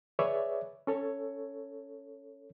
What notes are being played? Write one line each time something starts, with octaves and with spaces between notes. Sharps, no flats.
G#4 B4 C#5 D5 E5
C#4 A4 C#5